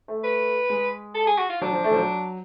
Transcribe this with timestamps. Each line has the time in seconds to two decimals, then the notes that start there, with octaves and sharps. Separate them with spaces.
0.08 A3
0.24 B4
0.70 G#3
1.15 A4
1.27 G#4
1.38 F#4
1.49 F4
1.61 F#3 D4
1.73 F3
1.84 A3
1.91 F3
1.96 F#3